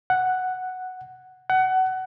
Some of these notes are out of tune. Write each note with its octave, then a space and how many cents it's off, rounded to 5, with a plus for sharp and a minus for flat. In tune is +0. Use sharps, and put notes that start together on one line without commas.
F#5 +0
F#5 +20